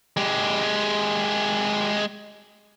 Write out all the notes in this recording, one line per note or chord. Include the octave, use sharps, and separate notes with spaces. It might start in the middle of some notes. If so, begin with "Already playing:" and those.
G#3 G4